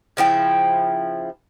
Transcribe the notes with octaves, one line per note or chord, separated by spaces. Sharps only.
C#3 F3 E4 G5